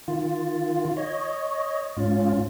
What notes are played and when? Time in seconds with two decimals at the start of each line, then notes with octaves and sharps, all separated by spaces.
0.08 D#3 F4
0.97 C#5 D#5
1.97 G#2 C#4 F4